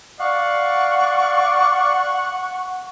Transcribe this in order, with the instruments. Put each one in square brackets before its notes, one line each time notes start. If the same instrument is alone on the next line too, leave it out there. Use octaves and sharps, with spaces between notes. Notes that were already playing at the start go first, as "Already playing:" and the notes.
[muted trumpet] D5 [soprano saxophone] F5 [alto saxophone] F#5 [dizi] C#6